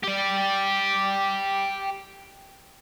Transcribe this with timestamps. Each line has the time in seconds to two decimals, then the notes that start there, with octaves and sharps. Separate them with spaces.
0.03 G4 D5